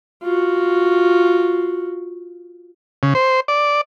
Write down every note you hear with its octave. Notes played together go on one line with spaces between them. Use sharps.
F4 F#4
C#3
C5
D5